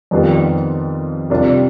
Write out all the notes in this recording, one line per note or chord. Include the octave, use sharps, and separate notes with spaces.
F2 D#3 G3 B3 F4
C3 G3 D4 F4